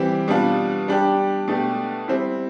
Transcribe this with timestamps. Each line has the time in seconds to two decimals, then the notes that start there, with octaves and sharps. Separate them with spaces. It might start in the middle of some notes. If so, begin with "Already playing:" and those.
Already playing: E3 G3 C4 G4
0.28 B2 G3 D4 F4
0.88 G3 D4 G4
1.48 B2 A3 D4 G4
2.08 G3 C4 E4